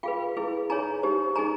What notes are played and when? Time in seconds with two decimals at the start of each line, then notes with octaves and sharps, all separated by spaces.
0.03 F4 G#4 B4 F5 G5
0.37 E4 G#4 B4
0.70 D#4 G#4 C#5 G#5 A#5
1.03 D#4 G4 C5
1.36 D#4 G#4 C5 G#5 A#5